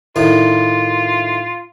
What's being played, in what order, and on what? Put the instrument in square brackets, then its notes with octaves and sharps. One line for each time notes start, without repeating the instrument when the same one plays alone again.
[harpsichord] A2 D#3 [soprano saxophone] F4